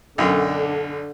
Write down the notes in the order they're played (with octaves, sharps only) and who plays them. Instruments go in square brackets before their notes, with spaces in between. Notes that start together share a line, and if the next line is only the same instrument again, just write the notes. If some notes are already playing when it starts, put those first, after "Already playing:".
[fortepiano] B1 F#2 [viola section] D3